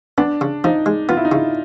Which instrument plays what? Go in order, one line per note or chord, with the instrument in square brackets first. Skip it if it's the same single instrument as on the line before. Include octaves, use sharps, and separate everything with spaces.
[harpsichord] B3 [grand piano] D4
[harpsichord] C#3
[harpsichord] F3 [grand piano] D#4
[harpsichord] G#3
[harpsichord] B3 [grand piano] F4
[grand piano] E4
D#4
[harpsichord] C#3 [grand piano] E4